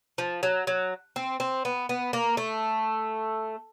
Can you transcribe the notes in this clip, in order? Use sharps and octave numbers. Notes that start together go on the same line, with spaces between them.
F3
F#3
F#3
C4
C4
B3
B3
A#3
A3